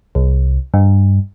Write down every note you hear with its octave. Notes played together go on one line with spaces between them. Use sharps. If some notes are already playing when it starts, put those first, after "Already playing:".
C2
G2